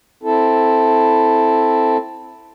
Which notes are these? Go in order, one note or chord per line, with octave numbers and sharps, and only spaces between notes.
C4 E4 A4